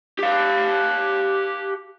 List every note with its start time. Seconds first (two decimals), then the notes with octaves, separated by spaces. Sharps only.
0.19 G4 F5